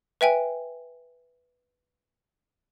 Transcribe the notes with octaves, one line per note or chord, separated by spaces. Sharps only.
B4 E5 G5 G#5